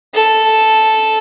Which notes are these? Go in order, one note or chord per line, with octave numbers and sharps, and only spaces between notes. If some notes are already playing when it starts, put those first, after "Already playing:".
A4